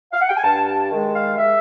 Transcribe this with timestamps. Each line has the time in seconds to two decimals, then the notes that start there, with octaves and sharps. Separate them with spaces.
0.13 F5
0.21 F#5
0.29 G5
0.37 G#5
0.43 G2 A5
0.67 A5
0.91 D#3 G#3
1.15 F5
1.38 E5